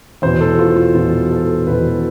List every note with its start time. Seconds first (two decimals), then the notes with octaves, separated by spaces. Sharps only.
0.22 E2 B2 C5
0.41 A4
0.59 F4
0.76 F4
0.95 E2 B2 F4
1.32 A4
1.67 E2 B2 B4